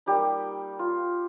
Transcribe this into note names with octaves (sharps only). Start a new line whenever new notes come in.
G3 A#3 D#4 G4
F4